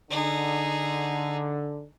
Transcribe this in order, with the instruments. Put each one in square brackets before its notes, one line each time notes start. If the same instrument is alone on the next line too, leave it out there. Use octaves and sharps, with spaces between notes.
[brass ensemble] D3 [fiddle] D#4 G#4